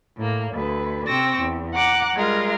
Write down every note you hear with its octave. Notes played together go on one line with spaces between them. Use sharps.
A2 A#3
D2 B4
C3 C4 C#6 D6 E6 A#6
E2
F#5 A#5 D6 F#6
G3 G#3 F4 A#4